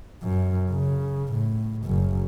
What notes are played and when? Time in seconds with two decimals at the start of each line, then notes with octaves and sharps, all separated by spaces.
0.22 F#2
0.71 C#3
1.33 A2
1.85 F#1 F#2